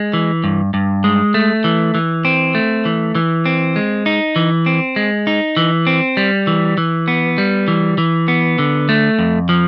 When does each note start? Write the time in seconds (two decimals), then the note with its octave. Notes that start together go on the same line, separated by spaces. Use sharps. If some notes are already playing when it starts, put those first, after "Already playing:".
Already playing: G#3
0.13 E3
0.44 G2
0.74 G2
1.04 G#3
1.34 A3
1.64 E3
1.95 E3
2.25 C4
2.55 A3
2.85 E3
3.15 E3
3.46 C4
3.76 G#3
4.06 D#4
4.36 E3
4.66 C4
4.96 G#3
5.27 D#4
5.57 E3
5.87 C4
6.17 G3
6.47 E3
6.78 E3
7.08 B3
7.38 G3
7.68 E3
7.98 E3
8.28 B3
8.59 D3
8.89 A3
9.19 F2
9.49 F3